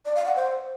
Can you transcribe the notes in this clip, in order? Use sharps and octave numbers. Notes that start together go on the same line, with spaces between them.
D5
F5
F#5
C5